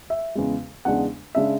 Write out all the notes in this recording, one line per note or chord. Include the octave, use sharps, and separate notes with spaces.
E5
E2 C#3 G#3
E2 C#3 G#3 D4 F#5
C#3 G#3 D4 E5